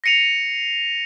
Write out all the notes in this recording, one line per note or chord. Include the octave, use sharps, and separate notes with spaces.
A#6 C7 C#7 D#7 F7